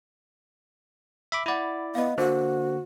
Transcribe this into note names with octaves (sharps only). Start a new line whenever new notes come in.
E5 B5 D6
E4 D5 F#5 B5
B3 D#5 F5
D3 A#3 F#4 C5